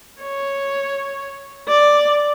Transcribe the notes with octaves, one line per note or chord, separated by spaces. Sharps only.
C#5
D5